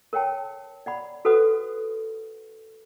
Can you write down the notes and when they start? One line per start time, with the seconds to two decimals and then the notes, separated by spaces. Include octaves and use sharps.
0.13 A#4 C#5 F#5 G5 A5
0.86 D5 F#5 B5
1.25 F#4 A4 B4 C5 F#5 D#6